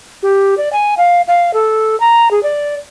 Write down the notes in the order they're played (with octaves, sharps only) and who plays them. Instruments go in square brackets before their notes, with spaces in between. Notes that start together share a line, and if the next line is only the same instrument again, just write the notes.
[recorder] G4
D5
G#5
F5
F5
A4
A#5
G#4
D5